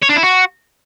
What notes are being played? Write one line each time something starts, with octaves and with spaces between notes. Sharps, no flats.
C#5
D4
E4
F#4